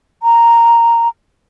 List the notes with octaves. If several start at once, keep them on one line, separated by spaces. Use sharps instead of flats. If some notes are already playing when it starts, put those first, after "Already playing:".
A#5